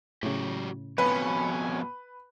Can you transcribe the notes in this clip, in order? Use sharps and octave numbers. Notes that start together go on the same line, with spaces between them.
A2 C#3 F#3 F#4 G4
F2 B2 B4 C#5 G#5